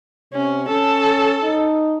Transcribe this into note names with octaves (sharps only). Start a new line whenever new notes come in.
C3 C#4
C#4 A4
D#4